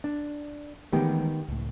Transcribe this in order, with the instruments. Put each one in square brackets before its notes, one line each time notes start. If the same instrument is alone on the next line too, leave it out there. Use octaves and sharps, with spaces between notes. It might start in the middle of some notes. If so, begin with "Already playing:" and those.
[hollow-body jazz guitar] D4
[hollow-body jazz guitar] D#3 B3 G4 [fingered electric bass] E3 G#3 A3
[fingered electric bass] C#2 A2